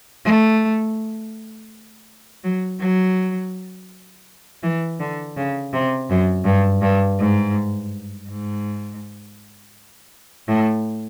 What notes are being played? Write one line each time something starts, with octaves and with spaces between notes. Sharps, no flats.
A3
F#3
F#3
E3
D3
C#3
C3
F#2
G2
G2
G#2
G#2
A2